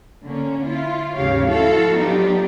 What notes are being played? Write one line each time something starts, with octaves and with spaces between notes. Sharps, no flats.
D3 A#3 C#4
E4 F4
D#2 G#2 C#3 G4 C#5 F5
F3 E4 F#4 A4 F5
F#3 B3 D4 D#4 F4 G4